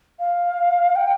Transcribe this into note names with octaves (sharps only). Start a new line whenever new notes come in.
F5
G5